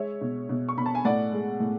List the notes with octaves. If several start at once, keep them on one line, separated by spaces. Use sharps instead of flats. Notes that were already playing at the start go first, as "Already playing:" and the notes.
Already playing: G#3 C#5 E5
B2
B2
C#6
B2 B5
A5
G#5
A2 D5 F#5
G#3
A2